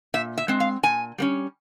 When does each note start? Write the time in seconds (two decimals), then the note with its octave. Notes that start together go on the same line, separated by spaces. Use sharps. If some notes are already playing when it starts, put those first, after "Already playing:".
0.14 A#2 E5
0.38 E5
0.48 G#3 C4
0.60 F5
0.83 A#2 G#5
1.18 G3 A#3 C#4